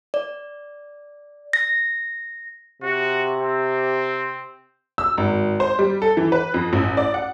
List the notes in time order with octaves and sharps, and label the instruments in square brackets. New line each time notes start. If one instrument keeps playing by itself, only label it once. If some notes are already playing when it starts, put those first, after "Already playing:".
[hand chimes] D5
A#6
[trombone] C3 [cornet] F#4
[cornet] C4
[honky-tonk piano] E6
G#1
C5
G3
A4
E3
B4
F2
A1
D5
F#5